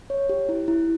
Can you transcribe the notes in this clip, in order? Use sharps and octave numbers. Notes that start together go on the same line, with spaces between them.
C#5
G4
E4
E4